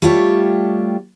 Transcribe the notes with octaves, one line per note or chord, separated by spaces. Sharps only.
G3 A3 D4 F4 G4 C#5